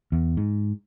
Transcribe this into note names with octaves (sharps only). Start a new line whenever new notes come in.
E2
G#2